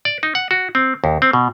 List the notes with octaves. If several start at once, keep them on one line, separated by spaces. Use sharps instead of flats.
D5
D#4
F#5
F#4
C4
D#2
C4
B2